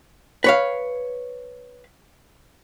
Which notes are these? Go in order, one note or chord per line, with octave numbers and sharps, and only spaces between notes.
B4 C#5 F5